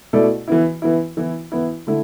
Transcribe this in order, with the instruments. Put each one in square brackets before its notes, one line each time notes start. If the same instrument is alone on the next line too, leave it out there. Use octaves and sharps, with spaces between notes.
[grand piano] B2 A3 E4 A4 D5
E3 B3 E4
E3 B3 E4
E3 B3 E4
E3 B3 E4
D3 A3 E4